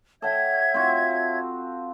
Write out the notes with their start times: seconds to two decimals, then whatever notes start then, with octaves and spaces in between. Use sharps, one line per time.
0.22 A4 C#5 E5 F#5 G5 G#6
0.74 C4 F4 F#4